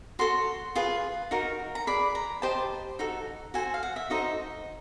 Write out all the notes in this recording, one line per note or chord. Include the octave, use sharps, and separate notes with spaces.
F#4 A4 C#5 C6
F4 G#4 B4
D#4 F#4 A#4
A#5
G#4 B4 D5 B5
A#5
G4 C5 D#5 A5
D#4 F#4 A4
F#4 A4 C5 G#5
F5
F#5
E5
D#4 F#4 A4 C5 D#5